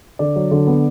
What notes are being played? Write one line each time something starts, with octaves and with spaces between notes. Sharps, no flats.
D3 D5
F#3
D3
B3